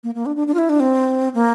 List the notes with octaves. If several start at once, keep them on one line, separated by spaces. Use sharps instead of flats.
A#3
A#3
D4
D4
D4
F4
E4
D4
C4
A#3